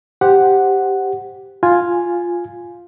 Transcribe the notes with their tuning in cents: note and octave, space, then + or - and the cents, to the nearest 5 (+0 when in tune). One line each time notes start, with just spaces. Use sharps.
G4 +0 C5 +0 F#5 +0
F4 +0 G#5 +0